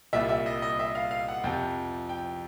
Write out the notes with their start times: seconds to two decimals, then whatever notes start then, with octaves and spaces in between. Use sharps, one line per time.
0.13 C2 A#2 G3 E5
0.29 E5
0.46 D#5
0.62 D#5
0.79 E5
0.95 F5
1.11 F5
1.28 F#5
1.44 F2 C3 F3 G5
2.09 G5